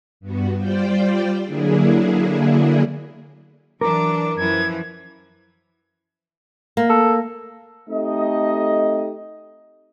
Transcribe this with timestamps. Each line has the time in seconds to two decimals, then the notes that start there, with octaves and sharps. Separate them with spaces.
0.20 G2 B3 F#4
0.56 G3 F4 C5 D5 G5
1.43 D3 F#3 A#3 D4 E4 G#4
3.81 E3 F#3 D4 A#4 D6
4.37 F#2 E3 F3 G#6
6.77 A#3
6.89 A4
7.90 A3 C4 D#4 G4 A4 D#5